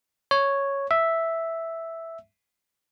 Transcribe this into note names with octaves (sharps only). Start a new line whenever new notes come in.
C#5
E5